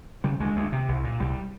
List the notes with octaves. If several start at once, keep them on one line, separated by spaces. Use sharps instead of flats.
C#3 G3
D2 G#3
D2
C3
C2
A#2
C2 G3